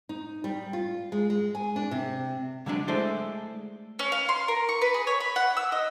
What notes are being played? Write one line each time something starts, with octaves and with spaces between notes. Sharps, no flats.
D#4
G3
F4
G#3
G#3
G#5
D4
C3
D3 F#3 G#3 D4
G#3 A3 E4 A4 C5 D5
C#4
F5
C6
A#4
C#6
B4
G#4
C#5
B5
F#5
E6
D#5